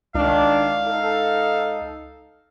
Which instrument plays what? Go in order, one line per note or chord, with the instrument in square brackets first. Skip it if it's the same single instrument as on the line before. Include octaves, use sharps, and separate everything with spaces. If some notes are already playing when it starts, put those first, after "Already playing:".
[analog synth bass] C#2 [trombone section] D#3 D4 [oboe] F5
[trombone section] D#4 A4